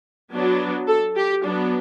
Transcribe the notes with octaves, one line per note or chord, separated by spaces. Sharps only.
F#3 B3 D4
A4
G4
F#3 B3 D4